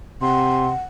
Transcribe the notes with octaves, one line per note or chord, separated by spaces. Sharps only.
C3 F#5 C6